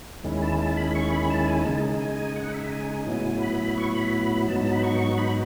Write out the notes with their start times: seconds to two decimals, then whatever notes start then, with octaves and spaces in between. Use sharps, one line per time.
0.24 D#2 D#3 G#3 C#4 E4
0.42 A5
0.59 A5
0.77 B5
0.95 C#6
1.13 B5
1.30 A5
1.48 G#5
1.65 C#3 G#3 D#4 A5
2.01 G#5
2.36 F#5
2.54 E5
2.72 G#5
3.06 A2 F#3 B3 E4
3.42 B5
3.78 C#6
3.95 B5
4.48 G#2 F#3 B3 D#4 A5
4.60 A5
4.72 B5
4.83 C#6
5.18 B5